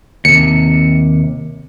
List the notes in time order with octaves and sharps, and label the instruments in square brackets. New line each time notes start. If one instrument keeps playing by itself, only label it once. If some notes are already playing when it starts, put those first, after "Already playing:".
[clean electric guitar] D#2 C3 [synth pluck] C#7